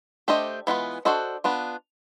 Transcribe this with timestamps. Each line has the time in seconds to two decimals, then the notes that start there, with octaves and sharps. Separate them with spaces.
0.28 A3 D4 G4 C5 D#5
0.67 E3 G#3 B3 D4 F4
1.05 D4 F#4 A4 C5 D#5
1.44 B3 D4 F4